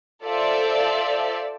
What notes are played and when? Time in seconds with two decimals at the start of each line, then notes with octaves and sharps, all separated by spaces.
0.23 F4 A4 C5 D5 E5 F5